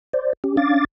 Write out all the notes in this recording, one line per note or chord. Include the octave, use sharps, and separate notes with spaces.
C5 D5
C#4 G4
C#4 D4 F5 D6 A6